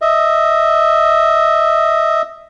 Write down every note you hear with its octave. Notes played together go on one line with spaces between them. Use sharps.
D#5 E5